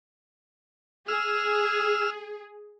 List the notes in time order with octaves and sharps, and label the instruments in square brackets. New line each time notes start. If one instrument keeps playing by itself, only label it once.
[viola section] G#4 [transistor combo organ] E6 F6